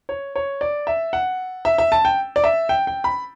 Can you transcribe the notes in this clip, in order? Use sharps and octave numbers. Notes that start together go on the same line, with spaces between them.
C#5
C#5
D5
E5
F#5
E5
E5
A5
G5
D5
E5
G5
G5
B5